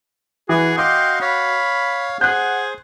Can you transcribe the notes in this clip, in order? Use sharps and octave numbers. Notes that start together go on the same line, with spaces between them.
E3 F#4 G#4
D#5 F5 G5 C6 D6
C#5 F5 B5
G#4 C5 F#5 F#6 G6